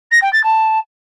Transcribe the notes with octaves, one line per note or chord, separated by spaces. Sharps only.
A#6
G5
A6
A5